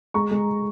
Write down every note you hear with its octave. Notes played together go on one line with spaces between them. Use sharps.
G#3 A#5 C#6
G#3